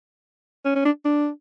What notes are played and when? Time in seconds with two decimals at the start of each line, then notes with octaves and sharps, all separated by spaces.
0.65 C#4
0.75 C#4
0.85 D4
1.05 D4